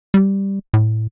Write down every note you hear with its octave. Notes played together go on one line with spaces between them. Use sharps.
G3
A2